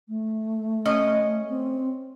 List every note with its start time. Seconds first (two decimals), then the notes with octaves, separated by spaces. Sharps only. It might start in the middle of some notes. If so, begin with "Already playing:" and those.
0.08 A3
0.85 C#4 D#5
1.49 C4